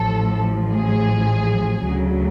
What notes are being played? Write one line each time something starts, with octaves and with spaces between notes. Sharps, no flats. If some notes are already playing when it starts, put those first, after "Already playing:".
Already playing: A1 A2 F3 A4
G#4
D2 C#3 F#3